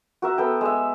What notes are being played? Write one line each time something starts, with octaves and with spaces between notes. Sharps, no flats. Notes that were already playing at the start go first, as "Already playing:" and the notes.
F#4 A#4 E5
B3 A4 G5
G#3 E5